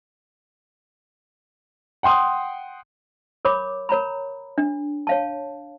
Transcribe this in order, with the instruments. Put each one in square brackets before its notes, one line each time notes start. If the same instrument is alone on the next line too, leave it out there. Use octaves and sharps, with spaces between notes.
[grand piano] F#5 G5 C6 D#6
[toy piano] A#4 C#5 B5 D6
A#4 C#5 A#5 B5
D4
C#5 F5 A5